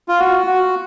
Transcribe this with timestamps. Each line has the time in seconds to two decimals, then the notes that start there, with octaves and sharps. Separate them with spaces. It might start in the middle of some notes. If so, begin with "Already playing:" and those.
0.08 F4
0.20 F#4
0.47 F#4